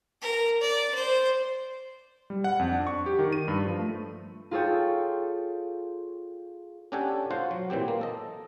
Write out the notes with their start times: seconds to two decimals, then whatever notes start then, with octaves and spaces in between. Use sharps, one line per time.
0.22 A#4
0.61 D5
0.94 C5
2.30 G3
2.44 F#5
2.59 F2
2.72 D4
2.87 C#6
3.06 G4
3.19 D#3
3.33 D#7
3.48 G2
3.65 F3
3.79 A3
4.51 F4 G#4 A4 C#5 G5
6.92 C#4 D4 G4 A4 F#5 G#5
7.31 F4 F#4 C5 F5 F#5
7.51 F#3
7.70 A#2 E3 C4 G4
7.88 A#3
8.01 A4 D#5